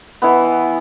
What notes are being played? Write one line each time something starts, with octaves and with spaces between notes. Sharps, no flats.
E3 B3